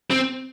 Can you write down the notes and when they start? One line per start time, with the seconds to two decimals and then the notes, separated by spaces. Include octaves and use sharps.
0.11 C4